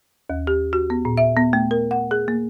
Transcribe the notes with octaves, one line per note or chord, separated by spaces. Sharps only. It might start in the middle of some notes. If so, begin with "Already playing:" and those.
D#2
G4
F#4
B3
A#2
E5
B3
A3
A#4
F#5
G#4
A#3